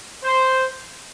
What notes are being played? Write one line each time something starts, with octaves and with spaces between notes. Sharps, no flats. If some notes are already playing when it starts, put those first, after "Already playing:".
C5